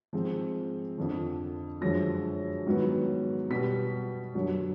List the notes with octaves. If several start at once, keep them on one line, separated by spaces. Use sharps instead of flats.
G#2 F3 G#3 C4
F2 D3 F3
F#2 D3 F3 G#3 A#6
G#2 D#3 F#3 B3
B2 G3 B3 B6
F#2 D3 F#3